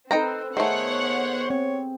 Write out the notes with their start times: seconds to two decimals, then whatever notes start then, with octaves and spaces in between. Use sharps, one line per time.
0.11 C4 D#4 A4 B4 G5 A#5
0.57 D#3 A3 B3 G#4 C5 C#5 F#5
1.50 C4 C#5